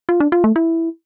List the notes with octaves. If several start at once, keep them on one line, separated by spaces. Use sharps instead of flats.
F4
D4
F4
A3
E4